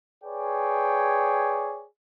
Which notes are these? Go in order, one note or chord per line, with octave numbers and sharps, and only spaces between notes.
G#4 B4 C#5 D5 G5